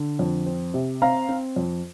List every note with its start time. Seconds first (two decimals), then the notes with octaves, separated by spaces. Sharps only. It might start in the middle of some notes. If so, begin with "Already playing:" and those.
Already playing: D3
0.19 F2
0.46 C4
0.74 C3
1.02 C4 F5 A#5
1.29 C4
1.56 F2